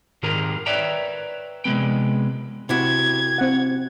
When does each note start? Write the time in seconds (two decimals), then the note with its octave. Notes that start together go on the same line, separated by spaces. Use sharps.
0.23 G#2 D#3 F4 G4 A#4 A#5
0.66 B4 C#5 D5 E5 G5 A#5
1.64 C3 G#3 A#3 B3 G5
2.69 C3 E4 F#4 G#6
3.38 C4 F#5